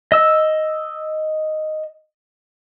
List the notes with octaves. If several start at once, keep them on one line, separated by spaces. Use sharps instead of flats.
D#5 E6